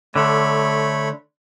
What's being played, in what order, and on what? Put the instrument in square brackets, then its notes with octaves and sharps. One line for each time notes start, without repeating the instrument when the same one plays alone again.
[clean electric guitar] D3 [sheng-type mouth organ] A3 C#5 B5